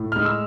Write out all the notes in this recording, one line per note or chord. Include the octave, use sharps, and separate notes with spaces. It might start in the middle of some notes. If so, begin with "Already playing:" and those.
Already playing: A2
G#3 F6
E6